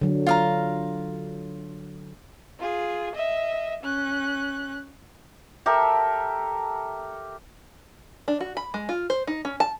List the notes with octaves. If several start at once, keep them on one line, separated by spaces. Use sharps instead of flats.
D3 F#3
F4 F5 A#5
F4 G#4
D#5 E5
C#4 F#6
G4 A4 A#4 E5
D4
F#4
B5
G#3
F4
C5
D#4
C#4
A5